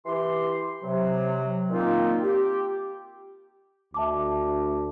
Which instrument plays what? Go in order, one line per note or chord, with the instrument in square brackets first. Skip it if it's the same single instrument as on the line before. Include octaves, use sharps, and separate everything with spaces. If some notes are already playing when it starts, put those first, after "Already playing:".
[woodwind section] E3 G4 C6
C3 F#3
A#2 D#3 A#3 C4 D#4 F4
G4
[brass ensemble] D2 [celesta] E5 A5 D6